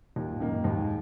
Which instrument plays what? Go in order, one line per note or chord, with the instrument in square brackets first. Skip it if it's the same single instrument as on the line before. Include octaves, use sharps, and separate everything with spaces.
[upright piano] D#2 [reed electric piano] A#2
[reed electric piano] G#2
[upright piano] D#3 A#3
[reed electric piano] F#2
[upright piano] D#2 [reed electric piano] G#2